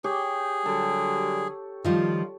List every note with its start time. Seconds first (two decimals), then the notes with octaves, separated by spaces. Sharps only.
0.04 G4 G#4 C#5 G5
0.66 D3 F#3 G3 A4
1.85 D#3 F3 G3 F4